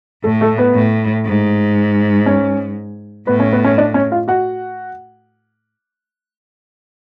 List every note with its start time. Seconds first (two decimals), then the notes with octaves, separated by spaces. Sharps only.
0.24 A2 A3 A4
0.41 A3 A4
0.58 B3 B4
0.75 A2
1.25 G#2
2.26 C#4 C#5
3.27 A2 B3 B4
3.39 C#4 C#5
3.52 B3 B4
3.65 C#4 C#5
3.78 D4 D5
3.94 C#4 C#5
4.12 F4 F5
4.28 F#4 F#5